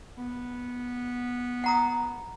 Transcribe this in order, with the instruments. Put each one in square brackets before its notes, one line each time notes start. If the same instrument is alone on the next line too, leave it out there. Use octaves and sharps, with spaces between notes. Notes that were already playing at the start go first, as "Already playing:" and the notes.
[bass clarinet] B3
[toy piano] F#5 A#5 D#6